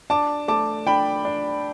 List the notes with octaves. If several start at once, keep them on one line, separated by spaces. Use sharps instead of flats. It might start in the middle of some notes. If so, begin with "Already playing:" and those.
D4 A5 D6
A3 A5 D6
D4 G5 B5
D4